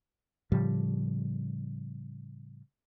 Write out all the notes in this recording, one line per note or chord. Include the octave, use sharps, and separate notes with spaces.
A2 C#3 F3 G3